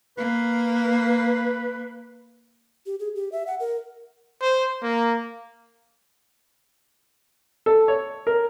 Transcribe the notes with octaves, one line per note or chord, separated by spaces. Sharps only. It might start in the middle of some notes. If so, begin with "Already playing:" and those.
A#3 B4
G4
G#4
G4
E5
F#5
A#4
C5
A#3
A4
C#5
A#4